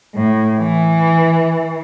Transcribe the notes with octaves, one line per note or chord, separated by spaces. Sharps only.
A2
E3